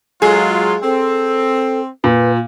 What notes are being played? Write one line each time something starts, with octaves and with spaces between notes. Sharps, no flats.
F#3 G#3 F4 G#4
C4 A4
A#2 B4